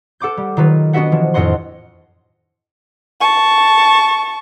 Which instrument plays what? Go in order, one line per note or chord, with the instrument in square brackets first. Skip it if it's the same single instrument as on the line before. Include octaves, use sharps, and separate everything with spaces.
[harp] A4 F#5 D6 G6
G3
D#3 F#3 F4 B4
B3 D4 F#4 D#5 E5 F#5
E3 F3
F2 A2 D#5 F#5 C6
[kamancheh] A5 C#6